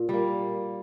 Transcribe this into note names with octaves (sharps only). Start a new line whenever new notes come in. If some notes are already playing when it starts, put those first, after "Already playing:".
Already playing: A#2
G3 A#3